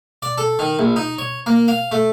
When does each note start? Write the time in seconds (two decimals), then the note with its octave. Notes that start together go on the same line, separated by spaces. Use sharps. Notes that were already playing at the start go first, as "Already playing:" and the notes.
0.22 D5
0.38 A4
0.59 D#3
0.79 A#1
0.96 D#4
1.18 C#5
1.46 A#3
1.68 F5
1.91 A3